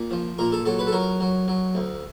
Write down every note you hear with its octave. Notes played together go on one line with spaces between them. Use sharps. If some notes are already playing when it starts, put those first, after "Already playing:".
Already playing: A#2
F3
A#2 A#4
A4
F#3 A4
B4
A4
F#3 A#4
F#3
F#3
D2